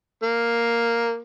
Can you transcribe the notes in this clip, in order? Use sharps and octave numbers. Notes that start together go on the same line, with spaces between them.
A#3